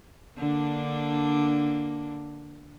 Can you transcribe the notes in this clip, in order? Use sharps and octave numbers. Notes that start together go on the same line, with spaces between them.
D3 A#3 D4